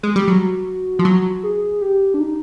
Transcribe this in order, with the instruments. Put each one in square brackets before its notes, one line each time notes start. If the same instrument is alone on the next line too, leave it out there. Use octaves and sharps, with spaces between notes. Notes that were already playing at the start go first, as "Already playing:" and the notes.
[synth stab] G#3
G3
[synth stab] F#3 [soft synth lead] F#4
[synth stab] F3
F#3
[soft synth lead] G#4
G4
D4
D#4